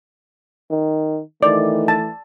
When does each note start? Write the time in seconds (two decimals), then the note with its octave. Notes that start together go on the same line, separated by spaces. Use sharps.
0.71 D#3
1.43 D#3 E3 A3 D5
1.88 A5